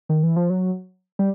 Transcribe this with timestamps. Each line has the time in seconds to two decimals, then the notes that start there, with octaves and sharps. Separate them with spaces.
0.09 D#3
0.23 E3
0.36 F3
0.50 F#3
1.19 G3